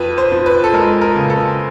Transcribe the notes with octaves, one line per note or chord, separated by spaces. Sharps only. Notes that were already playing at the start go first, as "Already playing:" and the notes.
Already playing: F2 B4
C5
F3
B4
A4
G#3 A#4
A#4
C#3
A4